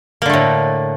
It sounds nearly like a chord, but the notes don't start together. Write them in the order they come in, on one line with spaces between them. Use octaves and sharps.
A#3 D3 A3 A2